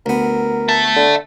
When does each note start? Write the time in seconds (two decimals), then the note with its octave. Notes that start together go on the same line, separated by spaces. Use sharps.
0.06 D2 B3 A#4
0.69 E5 A5
0.96 D3